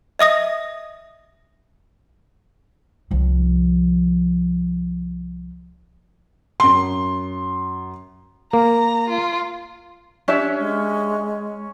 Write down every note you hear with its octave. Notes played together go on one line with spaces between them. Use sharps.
D#5 E5 D#6 A#6
C2 F3
F#2 C6
A#3 A#5
F4
C#4 D4 G4 C#5 E5
G#3